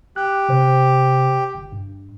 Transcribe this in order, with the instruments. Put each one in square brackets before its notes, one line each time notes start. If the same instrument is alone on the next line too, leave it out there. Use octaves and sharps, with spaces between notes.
[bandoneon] G4 [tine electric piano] F#6
[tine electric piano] C3 C5
G1
G2